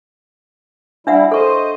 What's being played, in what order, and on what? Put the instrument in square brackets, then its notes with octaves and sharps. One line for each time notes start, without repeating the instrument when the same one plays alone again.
[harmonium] G3 E4 [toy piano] D4 E5 F#5
[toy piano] A4 C#6 [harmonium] C5 D#5